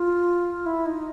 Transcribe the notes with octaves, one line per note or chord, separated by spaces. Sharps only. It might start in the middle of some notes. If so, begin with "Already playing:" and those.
Already playing: F4
E4
D#4